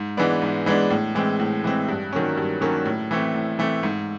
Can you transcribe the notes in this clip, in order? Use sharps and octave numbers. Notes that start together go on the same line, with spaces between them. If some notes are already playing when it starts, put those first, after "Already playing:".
Already playing: G#2
E3 G#3 B3 D4
G#2
E3 G#3 B3 D4
A2
E3 G#3 C4
A2
E3 G#3 C4
G2
D#3 F#3 A#3 C#4
G2
D#3 F#3 A#3 C#4
A2
E3 A3 C4
A2
E3 A3 C4
G#2